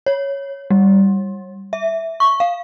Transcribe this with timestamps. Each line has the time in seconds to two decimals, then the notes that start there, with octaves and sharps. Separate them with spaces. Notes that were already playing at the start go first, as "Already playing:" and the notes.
0.06 C#5
0.70 G3
1.73 E5
2.20 C#6
2.40 F5